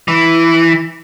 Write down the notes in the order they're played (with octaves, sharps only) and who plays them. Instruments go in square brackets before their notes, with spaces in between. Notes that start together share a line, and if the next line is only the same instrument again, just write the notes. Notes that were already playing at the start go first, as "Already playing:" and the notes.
[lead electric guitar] E3